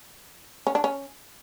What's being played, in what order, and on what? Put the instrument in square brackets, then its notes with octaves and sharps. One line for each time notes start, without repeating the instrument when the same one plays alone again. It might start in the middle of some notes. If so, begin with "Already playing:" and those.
[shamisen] C#4
D4
C#4